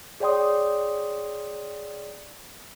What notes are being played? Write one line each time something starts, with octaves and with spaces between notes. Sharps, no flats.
G#4 C#5 D5 G5 C6 D#6